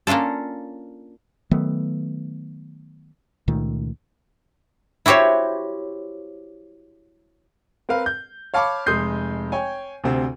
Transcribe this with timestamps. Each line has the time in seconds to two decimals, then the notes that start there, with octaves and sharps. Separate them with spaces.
0.07 A#3 C#4 D4 F4 A4
1.51 D#3 F#3 A3 B3
3.48 C#2 A#2 D#3 A3
5.06 E4 F#4 G4 C5 C#5
7.89 C4 A#4 B4 F5
8.06 G6
8.54 C#5 F5 A5 B5 C#6 D6
8.86 F1 G#3 C6 D#6 G6 C7
9.52 C#5 G5 G#5
10.04 D2 C3 C4